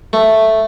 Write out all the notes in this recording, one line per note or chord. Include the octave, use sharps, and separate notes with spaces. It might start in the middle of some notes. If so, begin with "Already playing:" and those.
A3